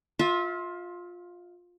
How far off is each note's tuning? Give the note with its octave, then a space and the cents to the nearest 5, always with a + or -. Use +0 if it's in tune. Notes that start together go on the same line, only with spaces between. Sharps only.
F4 +15 E5 -25